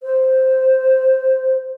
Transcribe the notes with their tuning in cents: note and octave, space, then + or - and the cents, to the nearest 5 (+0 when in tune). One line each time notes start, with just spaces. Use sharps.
C5 +0